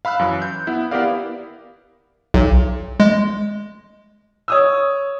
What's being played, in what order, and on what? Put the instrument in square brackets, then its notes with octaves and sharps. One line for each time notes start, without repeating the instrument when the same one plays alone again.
[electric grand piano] F5 B5 E6 F#6
F#2 E3
G6
B3 E4
B3 E4 G4 A#4 D5 F5
[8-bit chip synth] B1
G#3
[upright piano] C#5 D#6 E6